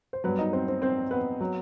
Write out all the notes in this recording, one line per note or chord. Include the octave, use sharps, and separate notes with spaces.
C5
G2 F#3 B3 B4
D#4 D#5
C4 C5
C4 C5
C4 C5
B3 B4
F#3